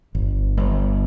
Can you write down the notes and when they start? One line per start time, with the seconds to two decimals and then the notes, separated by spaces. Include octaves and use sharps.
0.15 G1
0.57 G1